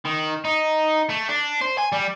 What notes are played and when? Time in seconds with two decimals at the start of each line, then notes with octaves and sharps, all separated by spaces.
0.05 D#3
0.45 D#4
1.10 A3
1.29 D4
1.61 C5
1.78 G#5
1.92 G3